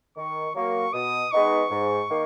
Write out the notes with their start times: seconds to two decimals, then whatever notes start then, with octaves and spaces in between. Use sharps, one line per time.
0.17 D#3 C#6
0.55 F#3 A#3 C#6
0.93 B2 D#6
1.32 G#3 B3 D#4 C#6
1.70 G#2
2.09 D#3 A#3